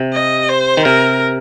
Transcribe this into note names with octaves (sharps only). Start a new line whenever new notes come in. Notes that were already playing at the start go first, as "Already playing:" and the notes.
Already playing: C3
D#5
C5
D#3
C3 A#4